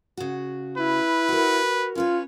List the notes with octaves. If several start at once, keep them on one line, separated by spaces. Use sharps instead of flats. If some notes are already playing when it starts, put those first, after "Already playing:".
C#3 F#4
E4 B4
F#4 A#4
C#4 F4 B4 C#5